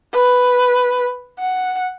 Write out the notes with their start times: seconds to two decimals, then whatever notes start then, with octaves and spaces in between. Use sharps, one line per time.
0.14 B4
1.39 F#5